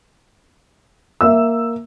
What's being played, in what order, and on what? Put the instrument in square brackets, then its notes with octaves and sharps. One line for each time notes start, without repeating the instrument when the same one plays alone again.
[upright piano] A#3 E5 E6